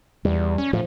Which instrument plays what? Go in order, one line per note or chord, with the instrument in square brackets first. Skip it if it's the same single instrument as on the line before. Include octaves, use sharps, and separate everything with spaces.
[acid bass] E2 [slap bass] G3
[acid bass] C#4
[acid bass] A2 [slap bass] F3